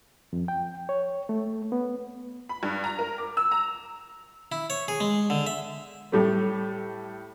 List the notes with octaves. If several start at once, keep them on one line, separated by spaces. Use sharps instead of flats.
F2
G5
C#5
A3
B3
B5
G2
A#5
A#4
D6
E6
A#5
E4
C#5
G#4
G#3
D3
E5
A2 G3 A3